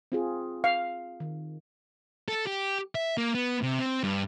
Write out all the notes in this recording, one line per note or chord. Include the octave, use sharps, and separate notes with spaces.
C4 F4 G#4
F5
D#3
A4
G4
E5
A#3
B3
C3
C4
G2